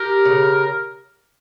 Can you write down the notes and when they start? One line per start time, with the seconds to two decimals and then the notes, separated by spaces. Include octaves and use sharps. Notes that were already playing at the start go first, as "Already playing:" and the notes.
Already playing: G4 A#4
0.25 C#3